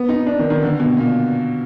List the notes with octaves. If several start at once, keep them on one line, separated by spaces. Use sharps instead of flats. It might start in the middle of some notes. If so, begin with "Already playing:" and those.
Already playing: B3
D#4
D4
D#3
D#3
D3
B2
A#2